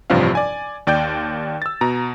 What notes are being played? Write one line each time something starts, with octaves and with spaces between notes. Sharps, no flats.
A1 G2 C3 F3 D4 F5
D5 G#5
D#2 D5 G5 G6
E6 A6
B2 A#5